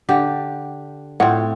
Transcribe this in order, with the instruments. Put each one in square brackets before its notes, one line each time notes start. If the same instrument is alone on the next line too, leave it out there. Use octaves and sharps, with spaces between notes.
[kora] D3 G4
[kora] A2 C4 C#5 [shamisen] F4 F#5